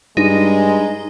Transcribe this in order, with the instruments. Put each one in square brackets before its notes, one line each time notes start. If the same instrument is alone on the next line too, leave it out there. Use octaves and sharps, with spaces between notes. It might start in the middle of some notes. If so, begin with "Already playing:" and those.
[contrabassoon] G2 [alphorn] G#3 [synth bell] D#4